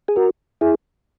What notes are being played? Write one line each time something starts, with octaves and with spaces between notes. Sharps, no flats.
G#4
F#4 A#4
E4 G#4